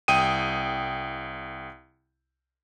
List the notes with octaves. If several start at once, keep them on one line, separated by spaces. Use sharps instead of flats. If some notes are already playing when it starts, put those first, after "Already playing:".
C2 G5 D#6 D#7